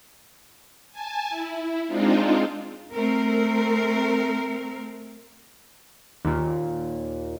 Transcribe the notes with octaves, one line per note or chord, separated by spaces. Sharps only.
G#5 A5
E4
G#3 C4 D4 D#4 F4
A3 C4 A#4
D#2 A#2